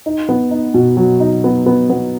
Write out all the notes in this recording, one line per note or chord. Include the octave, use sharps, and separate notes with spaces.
D#4
B3
D#4
B2
F#3
D#4
B3
B3
B3